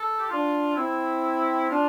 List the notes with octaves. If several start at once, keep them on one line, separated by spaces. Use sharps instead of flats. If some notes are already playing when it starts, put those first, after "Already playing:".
Already playing: A4
G4
D4 F4
C4 E4
D4 F4